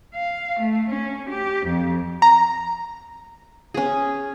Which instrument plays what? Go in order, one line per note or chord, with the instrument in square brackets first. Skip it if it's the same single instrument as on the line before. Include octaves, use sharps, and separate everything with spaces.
[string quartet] F5
A3
C#4
G4
F2
[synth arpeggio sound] A#5
[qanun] C#4 G#4